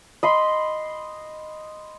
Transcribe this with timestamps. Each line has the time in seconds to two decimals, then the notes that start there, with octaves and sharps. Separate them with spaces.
0.23 D#5 B5 C6